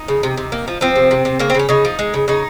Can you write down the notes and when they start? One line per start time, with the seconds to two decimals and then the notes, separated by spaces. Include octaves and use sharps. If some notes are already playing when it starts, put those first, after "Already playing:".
Already playing: D#4
0.08 C#3
0.23 C3
0.38 C3
0.52 A#3
0.68 F3
0.81 F3 C4
0.96 C3
1.11 C3
1.25 C3
1.40 C#3 A#3
1.50 C4
1.55 C#3
1.60 C#4
1.69 C#3 D#4
1.85 F3
1.99 G#3
2.14 C#3
2.28 C#3 D#4